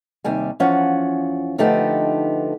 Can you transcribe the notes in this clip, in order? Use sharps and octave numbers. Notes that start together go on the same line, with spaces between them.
D#2 C3 G3 G#5
E2 F3 C#4 F4 F#5
D3 F3 A3 B3 D#4 G4